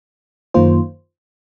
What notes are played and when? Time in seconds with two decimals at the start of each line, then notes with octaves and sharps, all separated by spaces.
0.54 F#2 D#3 A#3 F4 C5